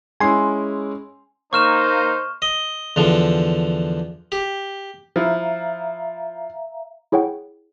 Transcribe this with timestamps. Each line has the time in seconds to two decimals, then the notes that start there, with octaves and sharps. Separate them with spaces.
0.20 G#3 C#4 E4 G#5 C6
1.53 A#3 D#4 C5 C#6 F6 E7
2.42 D#5
2.96 E2 D3 F3
4.32 G4
5.16 F3 E4 E5 F5 A#5
7.12 E4 G#4 C#5 F#5 G5